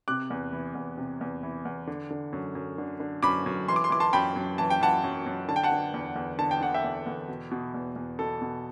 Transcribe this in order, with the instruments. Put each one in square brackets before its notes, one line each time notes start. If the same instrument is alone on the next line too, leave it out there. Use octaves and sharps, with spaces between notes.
[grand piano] C3 D6 F#6
E2
E3
E2
C3
E2
E3
E2
D3
D3
F#2
F#2
D3
D3
F#2 B5 D6
F#2
E3 C6
D6
C6
E3 D6
A5 C6
F#2 G5 B5
F#2
E3 A5
G5
E3 F#5 A5
F#2
F#2
D3 A5
G5
F#5 A5
D3
E2
E2
D3 A5
G5
D3 F#5
E5 G5
E2
E2
B2
B2
E2
E2
B2 A4
B2